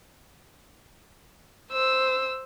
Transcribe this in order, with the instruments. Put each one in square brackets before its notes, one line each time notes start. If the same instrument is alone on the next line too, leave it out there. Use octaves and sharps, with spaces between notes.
[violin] C5 E6